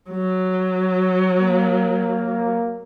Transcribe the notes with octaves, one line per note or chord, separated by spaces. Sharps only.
F#3
A#3